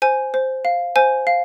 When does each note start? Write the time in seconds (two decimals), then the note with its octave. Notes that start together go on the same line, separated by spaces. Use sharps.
0.02 C5 G#5
0.34 C5
0.65 F5
0.96 C5 G#5
1.27 F5